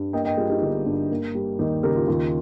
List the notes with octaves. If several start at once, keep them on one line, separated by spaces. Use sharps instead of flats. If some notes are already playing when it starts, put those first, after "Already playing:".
Already playing: G2
A#3 D#5 G5
D#5 G5
G3 F4 G#4
D#4 G4
G1 D#4
G2
A#3
G3
D#2 D#4 G4
C#3 G4 A#4
F4
D#2 F4